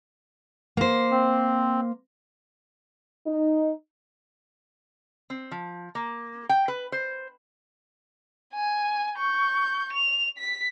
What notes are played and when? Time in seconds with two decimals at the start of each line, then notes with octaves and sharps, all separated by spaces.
0.77 A#3 C5
1.11 C4
3.26 D#4
5.30 C4
5.51 F3
5.95 A#3
6.49 G5
6.68 B4
6.92 C5
8.54 G#5
9.17 C#6 G6
9.93 F7
10.38 B6